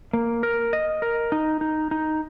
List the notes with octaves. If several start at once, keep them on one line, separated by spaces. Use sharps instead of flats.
A#3
A#4
D#5
A#4
D#4
D#4
D#4